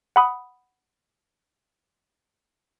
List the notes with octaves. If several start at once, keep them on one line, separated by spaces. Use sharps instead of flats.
F#5 B5 D#6